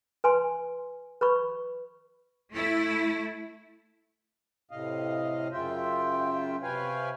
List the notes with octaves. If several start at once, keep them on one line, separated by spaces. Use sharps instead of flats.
B4 G#5 C6
B4 B5 C#6
A3 E4
A2 C3 D#5 F5
F#2 C#3 F4 E5 G5
C3 B4 C#5 F5 G5 G#5